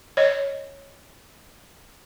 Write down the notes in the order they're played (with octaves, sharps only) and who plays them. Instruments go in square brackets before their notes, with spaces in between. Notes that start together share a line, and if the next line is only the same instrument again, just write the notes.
[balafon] C#5 D#5